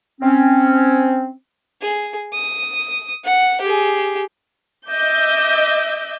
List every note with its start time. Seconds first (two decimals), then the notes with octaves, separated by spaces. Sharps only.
0.21 C4 C#4
1.82 G#4
2.34 D#6
3.24 F#5
3.61 G4 G#4
4.89 D#5 E5 D6 E6 G6